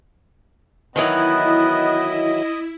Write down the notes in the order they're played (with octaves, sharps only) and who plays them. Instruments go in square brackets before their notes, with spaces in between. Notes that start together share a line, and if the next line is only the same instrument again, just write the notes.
[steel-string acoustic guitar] D#3 E3 F#3 [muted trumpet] B3 [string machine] E4 [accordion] D#5